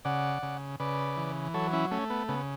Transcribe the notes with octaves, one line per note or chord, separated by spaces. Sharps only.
C#3 D5 F#5
C#3
C#3 B4 D5
E3
F#3 A4 C#5
C#4 E4
A3 C#4
B3
C#3 B3